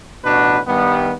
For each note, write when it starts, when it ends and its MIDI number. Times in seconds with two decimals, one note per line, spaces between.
0.25 0.59 33
0.25 0.59 47
0.25 0.59 62
0.25 0.59 66
0.25 0.59 71
0.66 1.13 43
0.66 1.13 51
0.66 1.13 55
0.66 1.13 59